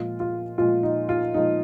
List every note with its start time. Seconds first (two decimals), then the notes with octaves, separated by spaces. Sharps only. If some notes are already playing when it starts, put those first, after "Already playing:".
Already playing: A#2 F3 G#3 F4
0.20 F4
0.58 A#2 F3 G#3 F4
0.83 D#4
1.09 F4
1.34 A#2 F3 G#3 D#4